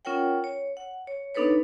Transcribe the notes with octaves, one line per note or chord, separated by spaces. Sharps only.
C#4 F4 A#4 C#5 F#5 G5
C#5
F#5
C#5
B3 D4 D#4 A4 B4 C#5